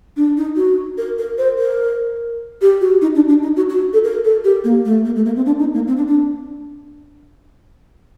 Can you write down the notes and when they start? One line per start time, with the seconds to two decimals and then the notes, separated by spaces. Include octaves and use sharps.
0.17 D4
0.37 D#4
0.57 F#4
0.98 A#4
1.18 A#4
1.38 C5
1.59 A#4
2.62 G4
2.81 F#4
3.02 D#4
3.15 D4
3.29 D4
3.43 D#4
3.56 F#4
3.69 F#4
3.93 A4
4.04 A#4
4.24 A4
4.44 G4
4.64 A#3
4.85 A3
5.05 A#3
5.16 A3
5.26 A#3
5.36 C4
5.46 D4
5.59 D#4
5.74 A#3
5.87 C4
5.97 D4
6.08 D4